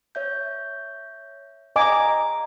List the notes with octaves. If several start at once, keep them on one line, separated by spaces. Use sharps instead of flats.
C#5 E5 G6
D#5 F5 G#5 A#5 D6